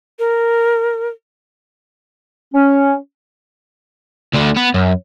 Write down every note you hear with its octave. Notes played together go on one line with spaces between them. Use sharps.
A#4
C#4
D2 D3
B3
F#2